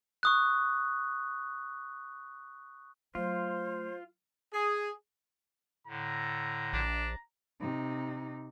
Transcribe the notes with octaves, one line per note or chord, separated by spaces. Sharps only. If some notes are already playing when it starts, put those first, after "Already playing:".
C#6 D#6 F#6
F#3 A3 F4 C5
G#4
A2 D3 A#5
A#1 D4
C3 D#4